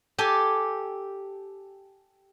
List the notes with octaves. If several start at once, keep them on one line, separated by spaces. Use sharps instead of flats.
G4 A4 G#5